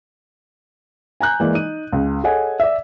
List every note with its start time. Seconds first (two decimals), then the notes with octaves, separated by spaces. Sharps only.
1.20 G#5 A#5 F#6 G6
1.40 E3 G#3 A#3 D5
1.54 D#4 D#7
1.92 C#2
2.24 G#4 A4 C#5 D#5 F#5 G#5
2.60 D5 E5